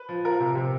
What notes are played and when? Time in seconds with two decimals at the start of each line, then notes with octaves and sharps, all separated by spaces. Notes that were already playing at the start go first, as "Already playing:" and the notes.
Already playing: B4
0.09 F3
0.25 F3 A#4
0.40 C3
0.55 C3